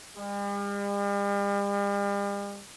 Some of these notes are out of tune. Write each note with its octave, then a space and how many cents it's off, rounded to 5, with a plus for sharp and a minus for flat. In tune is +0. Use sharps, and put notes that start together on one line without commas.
G3 +45